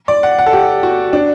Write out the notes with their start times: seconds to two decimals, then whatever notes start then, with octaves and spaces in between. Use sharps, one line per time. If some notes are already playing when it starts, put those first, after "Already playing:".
0.08 D5
0.23 F#5
0.38 F#5
0.46 A4
0.53 G4
0.83 F#4
1.13 D4